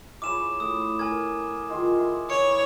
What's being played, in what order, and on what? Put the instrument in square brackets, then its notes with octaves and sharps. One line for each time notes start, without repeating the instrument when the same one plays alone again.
[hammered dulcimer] E4 G#4 C#5 [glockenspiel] D6 E7
[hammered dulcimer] A2 [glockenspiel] D#6
[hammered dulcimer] A#4 [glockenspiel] G#5 G#6
[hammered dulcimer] D#3 F4 G#4
E5 C6
[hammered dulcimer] E3 [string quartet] C#5 [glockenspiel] C#7